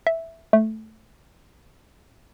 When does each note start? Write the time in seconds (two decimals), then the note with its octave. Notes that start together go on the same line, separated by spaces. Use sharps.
0.07 E5
0.53 A3